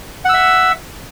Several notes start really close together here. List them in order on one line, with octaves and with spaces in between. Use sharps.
F#5 E6 E5